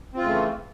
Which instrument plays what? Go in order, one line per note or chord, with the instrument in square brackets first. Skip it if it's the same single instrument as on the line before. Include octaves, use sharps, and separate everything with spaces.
[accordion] C4
F4
C#3
A3
E3